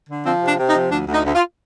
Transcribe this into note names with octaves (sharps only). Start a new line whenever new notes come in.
D3
F3 C4
C3
D4
C3
D#4
F3
D2 D4
D2
D#4
D2
F4